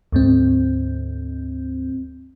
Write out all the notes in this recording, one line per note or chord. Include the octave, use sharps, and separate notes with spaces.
D2 G#2 C4